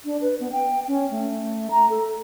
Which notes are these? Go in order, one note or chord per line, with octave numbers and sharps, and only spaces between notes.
D4
B4
B3
G5
C#4
A3
A#5
A4